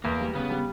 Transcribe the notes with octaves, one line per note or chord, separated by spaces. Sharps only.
E2 A#3
G3
C#3 B3
G3